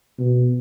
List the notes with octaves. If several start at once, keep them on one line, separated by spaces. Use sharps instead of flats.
B2